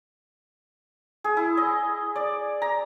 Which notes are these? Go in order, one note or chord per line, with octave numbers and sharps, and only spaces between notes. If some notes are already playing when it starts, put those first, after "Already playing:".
G#4
E4
D#5
D5
A#5